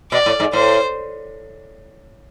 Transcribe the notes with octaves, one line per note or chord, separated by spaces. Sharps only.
B2 D5
A2
G#2
A2 C5